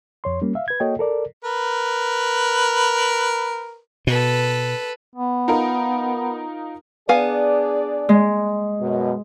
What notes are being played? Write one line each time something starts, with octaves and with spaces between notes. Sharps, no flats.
F2 C#5 C6
G3 A#3 C#4
E5 F5
B4 G#6
A#3 F#4 A4 C#5 D#5 G5
A4 A#4 D5
A#4 B4
B2 A4 B4
B3
D#4 F4 A#4
B3 D4 G#4 D5 F5 G#5
G#3
F#2 B2